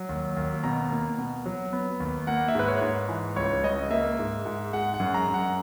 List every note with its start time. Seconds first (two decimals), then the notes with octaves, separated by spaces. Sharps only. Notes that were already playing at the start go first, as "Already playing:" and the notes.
Already playing: F#3
0.09 D#2
0.37 D#2
0.64 B2 A#5
0.91 A#3
1.18 B2
1.46 F#3
1.73 B3
2.00 D#2
2.27 A#3 F#5
2.48 E5
2.55 G#2 B4
2.68 C#5
2.82 G#2
3.09 E3
3.36 C#2 C#5
3.64 C#2 D#5
3.91 A#3 E5
4.19 G#2
4.46 G#2
4.73 G#3 F#5
4.94 F#5
5.00 F#2
5.14 A#5
5.27 F#2
5.34 F#5